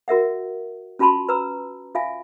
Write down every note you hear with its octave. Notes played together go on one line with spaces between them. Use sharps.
F#4 A#4 E5 F#5
C#4 F4 F#4 A5 B5 C6
B4 A#5 E6
F4 E5 F5 G#5